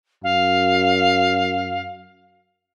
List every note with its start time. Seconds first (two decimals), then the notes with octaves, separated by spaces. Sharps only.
0.23 F#2 F5